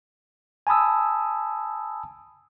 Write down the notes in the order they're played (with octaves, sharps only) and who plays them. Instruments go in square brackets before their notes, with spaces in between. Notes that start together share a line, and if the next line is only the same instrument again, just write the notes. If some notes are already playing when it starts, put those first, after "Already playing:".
[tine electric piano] G#5 A5 B5 D#6 E6